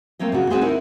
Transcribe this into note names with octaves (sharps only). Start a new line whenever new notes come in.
A3 A#3 C4 C#5 D#5
A#2 C#3 F#4
C4 D4 F#4 G#4 B4 C5
D#4 E4 A#4